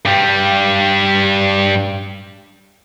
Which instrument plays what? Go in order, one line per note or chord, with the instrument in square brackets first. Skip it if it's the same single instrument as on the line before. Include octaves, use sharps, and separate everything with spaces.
[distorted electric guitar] G2 G3